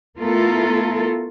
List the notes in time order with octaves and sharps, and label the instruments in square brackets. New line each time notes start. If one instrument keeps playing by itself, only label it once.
[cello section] A3 B3 E4 F4 A4 A#4